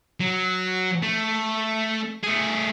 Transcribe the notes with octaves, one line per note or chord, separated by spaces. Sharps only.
F#3
A3
A3 G#4